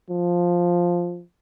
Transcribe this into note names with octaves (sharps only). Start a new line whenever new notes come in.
F3